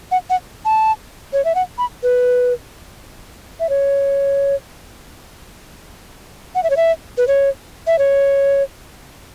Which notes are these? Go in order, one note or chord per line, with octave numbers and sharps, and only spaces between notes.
F#5
F#5
A5
C#5
E5
F#5
B5
B4
E5
C#5
F#5
E5
C#5
E5
B4
C#5
E5
C#5